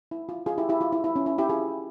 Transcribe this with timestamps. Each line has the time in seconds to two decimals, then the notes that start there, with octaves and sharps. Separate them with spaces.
0.11 E4
0.29 F4
0.46 F4 G#4
0.58 E4 G4
0.69 E4 G4
0.81 F4
0.92 E4
1.04 E4
1.16 C#4
1.26 E4
1.38 E4 G4
1.49 F4 G#4